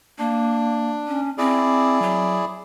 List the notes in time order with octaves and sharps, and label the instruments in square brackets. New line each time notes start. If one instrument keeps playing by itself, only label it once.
[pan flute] A#3 [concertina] D4
[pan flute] C#4
[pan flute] C4 [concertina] E4 G#4 D5
[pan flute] F#3